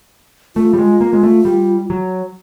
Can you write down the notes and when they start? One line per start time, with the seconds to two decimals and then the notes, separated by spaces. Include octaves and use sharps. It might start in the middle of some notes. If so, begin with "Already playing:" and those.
0.56 A3 F4
0.74 G3
0.79 G#3
1.01 A#3
1.13 G#3
1.23 A3
1.45 G3
1.90 F#3